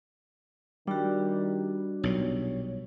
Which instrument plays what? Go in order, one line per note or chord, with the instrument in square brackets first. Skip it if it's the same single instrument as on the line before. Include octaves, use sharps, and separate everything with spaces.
[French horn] D#3 [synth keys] G3 [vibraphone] D4 F#4
[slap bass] B1 A#2 [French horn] C#5